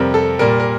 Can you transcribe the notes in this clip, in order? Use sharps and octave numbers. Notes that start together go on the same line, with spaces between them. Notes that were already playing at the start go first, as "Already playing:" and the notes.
Already playing: F2 C3 G3 A#4
A4
A#2 G3 A#4
A#4